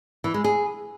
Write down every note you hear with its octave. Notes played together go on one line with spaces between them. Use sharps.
E3
G#3
G#4